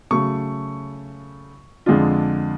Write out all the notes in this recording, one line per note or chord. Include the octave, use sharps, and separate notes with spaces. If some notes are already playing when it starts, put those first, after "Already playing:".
C#3 F#3 A3 C#6
F2 D3 G#3 D4 F4